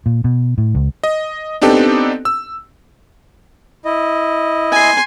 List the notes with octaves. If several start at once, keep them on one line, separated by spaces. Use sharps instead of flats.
A#2
B2
A2
C#2
D#5
B3 C4 D4 D#4 G4 A4
E6
E4 D#5
G#5 C6